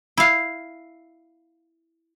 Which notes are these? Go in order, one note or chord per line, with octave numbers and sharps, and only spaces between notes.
E4 F5